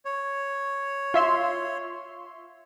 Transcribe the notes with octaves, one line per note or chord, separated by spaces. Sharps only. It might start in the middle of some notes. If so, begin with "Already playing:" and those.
C#5
F4 E5 C6